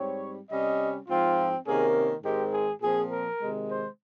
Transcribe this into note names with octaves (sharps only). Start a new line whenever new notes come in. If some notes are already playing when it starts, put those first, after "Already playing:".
Already playing: G#2 G3 C4 C#5
C3 G3 C#4 D#5
G#2 F3 C4 F4
C3 D#3 A#3 C#4 G#4
G#2 D#3 G#3 C4 G4
G#4
A#2 F3 C4 G#4
A#4
C3 D#3 G#3
C5